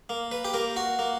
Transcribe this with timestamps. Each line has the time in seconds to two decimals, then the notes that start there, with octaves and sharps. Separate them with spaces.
0.09 A#3
0.31 B4
0.45 G4
0.54 A#3 A#4
0.76 F#4
0.99 A#3